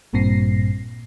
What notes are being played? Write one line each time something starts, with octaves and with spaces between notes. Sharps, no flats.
A1 G2 A#2 C4 A#6 C7